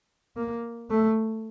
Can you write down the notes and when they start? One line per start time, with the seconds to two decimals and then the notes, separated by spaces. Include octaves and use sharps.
0.36 A#3
0.90 A3